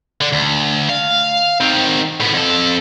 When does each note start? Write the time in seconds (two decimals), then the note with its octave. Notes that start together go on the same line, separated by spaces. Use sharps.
0.21 D3 D4
0.32 D2
0.89 F5
1.60 D#3 C4
2.20 A2 B3
2.33 F2 A4